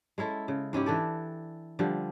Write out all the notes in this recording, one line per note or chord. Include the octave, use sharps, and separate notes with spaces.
G#3 C#4 E4 A4
C#3
G#2 C#4 E4 G4
E3 D4 A4 D5
D3 F3 G3